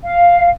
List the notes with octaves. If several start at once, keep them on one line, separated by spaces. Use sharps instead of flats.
F5